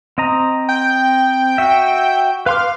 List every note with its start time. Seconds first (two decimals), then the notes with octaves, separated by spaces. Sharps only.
0.18 C4 D#5 A#5
0.69 G5
1.58 F#4 E5
2.46 B4 F5 C6 D6